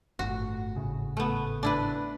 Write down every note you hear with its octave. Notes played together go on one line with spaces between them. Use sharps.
G1 A2 F#4
G#1 A2 C#3
A3 B3
D4 E4 B4